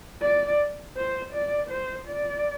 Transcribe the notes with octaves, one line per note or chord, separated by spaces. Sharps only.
D5
C5
D5
C5
D5